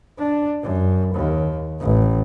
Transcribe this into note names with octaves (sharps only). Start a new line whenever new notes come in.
D4
F#2
D#2
A1